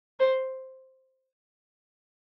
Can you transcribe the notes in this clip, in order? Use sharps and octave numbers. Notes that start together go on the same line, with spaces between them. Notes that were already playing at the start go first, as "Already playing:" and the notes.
C5